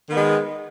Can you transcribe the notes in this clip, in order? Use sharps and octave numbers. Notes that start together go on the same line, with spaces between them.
D#3 G#3 B3